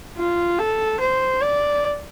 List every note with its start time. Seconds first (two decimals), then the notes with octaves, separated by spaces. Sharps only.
0.17 F4
0.58 A4
1.00 C5
1.42 D5